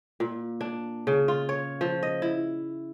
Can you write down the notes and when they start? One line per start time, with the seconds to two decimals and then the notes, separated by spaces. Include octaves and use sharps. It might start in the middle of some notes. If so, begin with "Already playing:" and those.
0.20 A#2
0.61 D4
1.07 C#3
1.28 F4
1.49 C#5
1.81 F3
2.03 D#5
2.22 E4